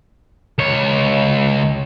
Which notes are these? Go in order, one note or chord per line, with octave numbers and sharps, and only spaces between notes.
C#2 C#5